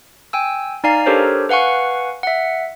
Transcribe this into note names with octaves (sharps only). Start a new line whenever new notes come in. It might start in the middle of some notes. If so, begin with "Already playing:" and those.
G5 G#5 E6
D#4 D5 F5 G#5 A#5 C7
D4 G4 A4 A#4 C5 C#5
B4 F5 F#5 G#5 C#6
E5 F#5